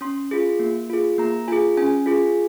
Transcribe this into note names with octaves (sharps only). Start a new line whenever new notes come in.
C#4 C6
F4 G#4
A#3
F4 G#4
A#3 A#5
F4 G#4 G#5
C#4 G#5
F4 G#4